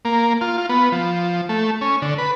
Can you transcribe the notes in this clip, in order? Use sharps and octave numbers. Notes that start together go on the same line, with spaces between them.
A#3
F4
F4
B3
F3
A3
C#4
D3
B4